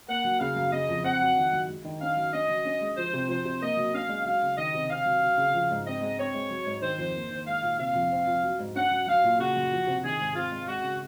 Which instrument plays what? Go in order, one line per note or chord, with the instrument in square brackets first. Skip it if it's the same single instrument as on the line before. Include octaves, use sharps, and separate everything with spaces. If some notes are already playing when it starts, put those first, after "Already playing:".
[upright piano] A#3 [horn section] F#5
[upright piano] F#3
[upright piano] C#3 [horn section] F5
[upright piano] F#2
[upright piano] C#3 [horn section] D#5
[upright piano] F2
[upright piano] C4 [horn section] F#5
[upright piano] F#3
D#3
F#2
G#3
D#3
[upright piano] C#4 [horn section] F5
[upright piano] F#3
[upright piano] C#4 [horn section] D#5
[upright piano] F#3
C#4
G#3
[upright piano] F3 [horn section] C5
[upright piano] C3
[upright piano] F3 [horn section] C5
[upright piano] C3
[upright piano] A#3 [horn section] D#5
[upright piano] F#3
[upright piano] C#4 [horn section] F5
[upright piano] G#3
[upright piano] F#3 [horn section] F5
[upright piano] C#3
[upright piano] D#3 [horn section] D#5
[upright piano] C3
[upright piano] C4 [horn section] F5
[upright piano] F#3
F#3
C#3
F3
G#2
[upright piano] C4 [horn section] D#5
[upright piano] G#3
[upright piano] C4 [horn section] C#5
[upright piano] G#3
F#3
G#2
[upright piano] D#3 [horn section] C5
[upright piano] F2
A#3
D#3
[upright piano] G#3 [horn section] F5
[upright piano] A#2
[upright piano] C3 [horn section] F5
[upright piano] F2
C4
F3
F#3
G#2
[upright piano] C#4 [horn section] F#5
[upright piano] F#3
[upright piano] F#3 [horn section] F5
[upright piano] A#2
[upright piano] C#3 [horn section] F#4
[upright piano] F#2
F3
C3
[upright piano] D#3 [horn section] G#4
[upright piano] G#2
[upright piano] C4 [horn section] F4
[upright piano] G#3
[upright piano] G#3 [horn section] F#4
[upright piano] C#3